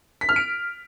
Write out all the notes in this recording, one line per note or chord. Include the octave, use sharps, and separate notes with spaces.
B6
F6
D7